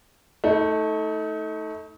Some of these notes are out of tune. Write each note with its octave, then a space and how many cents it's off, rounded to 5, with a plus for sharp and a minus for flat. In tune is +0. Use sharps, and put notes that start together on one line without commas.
A3 +0 D#4 +35